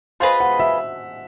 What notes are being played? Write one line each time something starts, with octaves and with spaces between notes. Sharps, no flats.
F4 G#4 B4 C5 D#5
F#5
E5